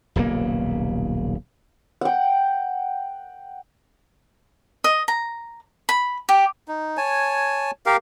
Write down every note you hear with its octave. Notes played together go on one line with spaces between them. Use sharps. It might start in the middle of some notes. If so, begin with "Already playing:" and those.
D#1 B1 C#3 A#3
F#5 G5
D#5
A#5
B5
G4
D#4
C#5 G#5 A5
G4 A#4 F5